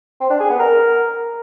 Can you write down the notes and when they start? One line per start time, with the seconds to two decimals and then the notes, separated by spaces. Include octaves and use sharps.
0.21 C4
0.30 D4
0.40 G#4
0.50 B3
0.59 A#4